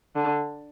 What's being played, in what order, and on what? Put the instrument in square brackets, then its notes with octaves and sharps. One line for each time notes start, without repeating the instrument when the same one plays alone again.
[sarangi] D3